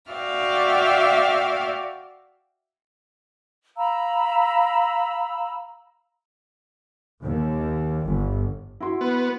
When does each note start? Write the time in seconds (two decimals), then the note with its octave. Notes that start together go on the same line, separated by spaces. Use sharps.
0.11 F#4 D5 E5 F5 G5
3.77 F5 A#5 B5 E6
7.23 D#2
8.04 G1
8.81 E4 F#4 C6
9.01 B3